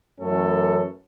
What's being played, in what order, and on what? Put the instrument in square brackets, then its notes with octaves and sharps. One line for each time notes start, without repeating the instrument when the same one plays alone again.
[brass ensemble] F#2 E3 A3 C#4 A4